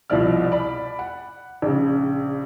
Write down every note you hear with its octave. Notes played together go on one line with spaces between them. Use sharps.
C2 B2 F3 E4 D5 F6
D5 B5
F#5
A#1 C#3